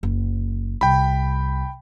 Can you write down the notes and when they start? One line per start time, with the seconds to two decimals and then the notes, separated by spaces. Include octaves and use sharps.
0.03 F#1
0.81 C2 G5 B5